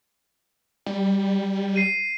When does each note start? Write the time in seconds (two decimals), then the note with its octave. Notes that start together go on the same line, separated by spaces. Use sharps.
0.86 G3
1.76 C7 D#7